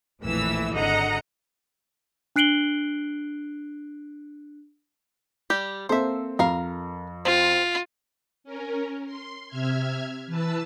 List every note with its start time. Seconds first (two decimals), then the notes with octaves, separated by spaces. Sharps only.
0.21 A#1 F2 A2 E3 E6
0.73 G#1 D3 D#5 F#5 A#5
2.36 D4 F#6 C7 D7 F#7 G7
5.50 G3 G4
5.89 A#3 C4 A4 C5 E5
6.39 F2 A#4 F5
7.25 C4 F4
8.44 C#4 A#4
9.06 C6
9.48 C3 E5 F6 G#6
10.27 E3 B4 A5 E6